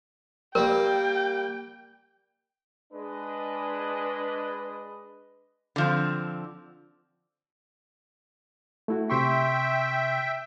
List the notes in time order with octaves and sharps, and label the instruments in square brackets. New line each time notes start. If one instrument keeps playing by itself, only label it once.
[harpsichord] G3 A#3 [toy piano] A#4 [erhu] G5
[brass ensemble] G#3 D4 B4 D#5
[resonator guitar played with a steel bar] D3 F3 C4
[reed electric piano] A3 E4 F#4
[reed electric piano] C3 C6 C#6 [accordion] E5 G5